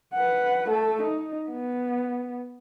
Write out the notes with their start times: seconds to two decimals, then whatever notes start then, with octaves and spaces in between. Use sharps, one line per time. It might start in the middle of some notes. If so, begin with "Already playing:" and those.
0.14 B4 F#5
0.69 A3 A4
1.02 D#4
1.50 B3